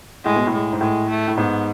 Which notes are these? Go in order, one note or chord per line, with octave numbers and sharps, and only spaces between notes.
A2 G#3
B2
A2
G#3
G#2
A2 G#3
A3
A2
G#2 B3